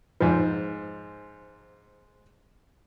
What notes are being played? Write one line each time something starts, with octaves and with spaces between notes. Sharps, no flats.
G#2 F3